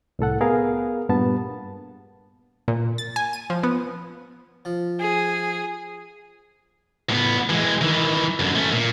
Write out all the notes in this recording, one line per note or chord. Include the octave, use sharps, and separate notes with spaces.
C2 A2 A4 F#5
B3 G#4 A#4 F5
G2 A#2 B3 A5
A#2
A6
G#5
D#7
F3
B3
F3
G#4
A2 B3
E3 G#3
D#3 E3
F#2 D3
A3 C#4
A#2